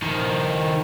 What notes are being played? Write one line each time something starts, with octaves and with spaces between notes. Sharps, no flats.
D#3 F3